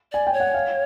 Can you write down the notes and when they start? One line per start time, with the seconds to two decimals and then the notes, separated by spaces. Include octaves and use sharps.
0.12 D5 G#5
0.27 G5
0.33 C#5
0.40 F#5
0.54 F5